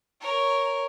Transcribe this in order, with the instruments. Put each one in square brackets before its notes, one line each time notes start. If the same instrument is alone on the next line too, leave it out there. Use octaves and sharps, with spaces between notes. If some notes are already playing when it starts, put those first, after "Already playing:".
[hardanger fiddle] A#4 C#5